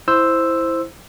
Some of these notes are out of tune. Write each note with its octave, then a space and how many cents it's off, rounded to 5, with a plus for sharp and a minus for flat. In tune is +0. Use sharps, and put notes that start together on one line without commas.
E4 +0 C5 +0 E6 +0